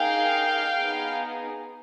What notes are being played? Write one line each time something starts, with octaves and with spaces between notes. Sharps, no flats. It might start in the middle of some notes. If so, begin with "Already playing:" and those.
Already playing: A#3 D#4 G#4 F5 G5
B3 D#4 G#4